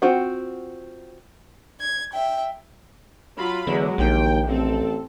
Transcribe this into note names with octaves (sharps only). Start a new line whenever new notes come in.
C4 F4 F#4 F#5
G#6
E5 G5
F#3 F4 B5
E2 D3 F#3 G#3
A#1 D#2 G5
A1 C4 A4